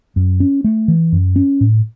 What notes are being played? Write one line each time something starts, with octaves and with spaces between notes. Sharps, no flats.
F#2
C#4
A3
E3
F#2
C#4
A2